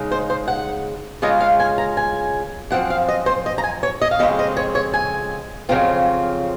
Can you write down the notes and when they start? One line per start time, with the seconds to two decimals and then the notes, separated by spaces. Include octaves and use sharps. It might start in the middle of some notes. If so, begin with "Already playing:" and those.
Already playing: C#3 G#3 D#4
0.11 C5
0.30 C5
0.48 F#5
1.22 C#3 G#3 C#4 F4 D#5
1.40 F5
1.60 G#5
1.78 A#5
1.97 G#5
2.71 F#2 F3 C4 F#5
2.90 F5
3.08 D#5
3.26 C5
3.46 D#5
3.58 A#5
3.64 G#5
3.83 C#5
4.01 D#5
4.11 F5
4.19 F2 C#3 G#3 C4 D#5
4.39 D#5
4.57 C#5
4.75 C#5
4.93 G#5
5.69 F2 C#3 F#3 C4 F4